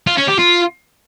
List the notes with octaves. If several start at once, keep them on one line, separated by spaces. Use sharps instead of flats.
F4
C#4
G4
F4